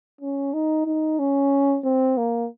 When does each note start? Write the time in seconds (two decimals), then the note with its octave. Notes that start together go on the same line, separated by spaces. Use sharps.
0.21 C#4
0.54 D#4
0.86 D#4
1.19 C#4
1.85 C4
2.17 A#3